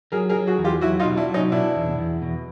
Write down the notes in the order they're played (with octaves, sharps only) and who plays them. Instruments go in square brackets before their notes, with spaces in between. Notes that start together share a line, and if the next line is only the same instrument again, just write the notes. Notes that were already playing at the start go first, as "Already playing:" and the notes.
[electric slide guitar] F#3 [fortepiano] G#4 A#4
[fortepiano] G#4 A#4
[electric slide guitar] F#3
[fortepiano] F#4 G#4
[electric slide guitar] E2
[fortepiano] F4 G4
[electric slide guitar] F#3 [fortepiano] E4 F#4
[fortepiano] D#4 F4
[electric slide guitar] B2
[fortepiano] D4 E4
[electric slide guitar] F#3
[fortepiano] C#4 D#4
[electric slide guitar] B2 [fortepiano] D4 E4
[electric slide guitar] E2
E2
B2